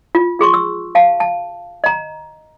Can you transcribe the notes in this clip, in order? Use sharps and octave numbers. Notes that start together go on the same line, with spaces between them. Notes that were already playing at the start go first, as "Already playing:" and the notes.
F4
F4 G#4 C6 C#6
E6
F5 A5
A5
D#5 A#5